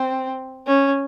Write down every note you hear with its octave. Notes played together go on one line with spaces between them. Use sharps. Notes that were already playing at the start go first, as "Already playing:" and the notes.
Already playing: C4
C#4